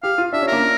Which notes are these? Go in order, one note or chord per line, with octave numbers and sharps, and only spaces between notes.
G4 F5
F4
D4 E5
C#4
A#3 A#4
C#4